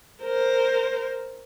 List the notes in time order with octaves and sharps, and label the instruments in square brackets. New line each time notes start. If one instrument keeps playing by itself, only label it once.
[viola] A#4 C5